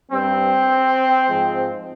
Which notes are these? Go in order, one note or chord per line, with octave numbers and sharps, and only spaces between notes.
G2 G3 C4
G#2 F3 G#3